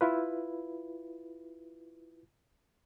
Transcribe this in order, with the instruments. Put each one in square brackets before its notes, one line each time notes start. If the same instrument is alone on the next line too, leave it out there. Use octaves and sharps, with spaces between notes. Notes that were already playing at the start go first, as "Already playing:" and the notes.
[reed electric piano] E4 F4 B4